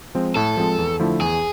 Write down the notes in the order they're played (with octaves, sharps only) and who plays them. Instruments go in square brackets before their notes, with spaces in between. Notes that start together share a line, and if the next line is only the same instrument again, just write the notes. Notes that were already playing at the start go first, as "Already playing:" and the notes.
[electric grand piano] F3 G#3 C4
[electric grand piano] A2 [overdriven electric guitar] A4
[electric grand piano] F3 G#3 C4
E2
D3 F3 A3 E4
[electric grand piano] E2 [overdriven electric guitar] G#4